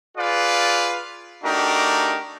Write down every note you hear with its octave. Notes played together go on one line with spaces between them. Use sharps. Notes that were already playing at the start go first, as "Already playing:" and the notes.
F4 G#4 B4 D5 F5
A3 D4 D#4 F#4 G4 A#4